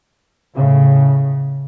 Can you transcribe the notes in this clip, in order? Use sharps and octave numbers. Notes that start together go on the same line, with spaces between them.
A2 C#3